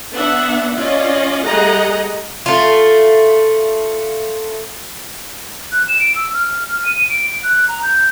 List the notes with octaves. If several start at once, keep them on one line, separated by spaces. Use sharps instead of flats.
B3 D4 E5 F#5
C#4 F4 D5 D#5
G3 A3 G#4 D#5 F#5 A#5
A3 F4
F#6
E7
D7
E6
F6
F6
D#7
D7
F#6
A#5
G6